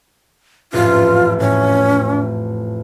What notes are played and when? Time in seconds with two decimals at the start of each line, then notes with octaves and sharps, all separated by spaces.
0.73 A1 F2 G#2 F4
1.40 A2 C#4